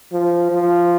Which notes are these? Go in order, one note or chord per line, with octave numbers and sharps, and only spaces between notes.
F3
F3